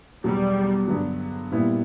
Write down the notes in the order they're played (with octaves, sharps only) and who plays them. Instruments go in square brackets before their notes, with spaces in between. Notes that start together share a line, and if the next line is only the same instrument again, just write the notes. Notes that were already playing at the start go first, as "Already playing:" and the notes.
[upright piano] E2 B2 F#3 B3 [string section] G3
[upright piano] G2 D3 F#3 B3 D4
A#2 G3 B3 E4